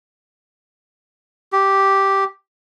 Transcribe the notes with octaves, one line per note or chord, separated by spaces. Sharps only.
G4